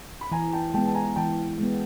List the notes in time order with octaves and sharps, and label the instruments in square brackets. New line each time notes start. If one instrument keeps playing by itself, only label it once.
[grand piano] B5
[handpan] E3 [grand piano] G#5 A#5
[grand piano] G5 A5
[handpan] G#3 B3 [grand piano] G5 A5
[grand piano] A5
G#5 A#5
[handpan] E3 [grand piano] G5 A5
[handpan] G#3 B3